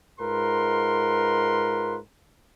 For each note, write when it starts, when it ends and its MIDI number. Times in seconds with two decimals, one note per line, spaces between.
0.20 1.97 44
0.20 1.97 65
0.20 1.97 70
0.20 1.97 71
0.20 1.97 84